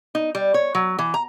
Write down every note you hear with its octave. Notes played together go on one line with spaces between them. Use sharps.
D#4
G3
C#5
F#3
E3
A#5